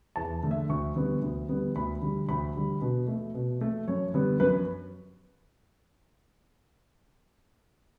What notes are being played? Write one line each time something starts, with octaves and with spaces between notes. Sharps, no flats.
E2 A5
D3 A3
E5
D2 C#6
D3 G3 B3
D2
D3 G3 B3
D2 B5
D3 G3
D2 B5
D3 G3
B2
A3
B2
A3
F#2 C#5
D3 G3 B3
F#2 B4